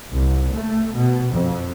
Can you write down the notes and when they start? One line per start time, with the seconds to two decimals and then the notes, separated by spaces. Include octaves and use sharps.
0.10 C2
0.52 A3
0.94 B2
1.31 F2